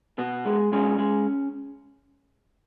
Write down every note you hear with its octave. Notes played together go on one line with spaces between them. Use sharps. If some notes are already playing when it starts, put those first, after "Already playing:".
B2 B3
G#3
B2 G#3 C#4
G#3